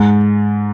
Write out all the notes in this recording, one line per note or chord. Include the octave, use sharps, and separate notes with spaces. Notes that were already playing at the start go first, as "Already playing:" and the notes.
Already playing: G#2